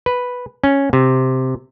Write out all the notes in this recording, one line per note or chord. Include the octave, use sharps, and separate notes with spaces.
B4
C#4
C3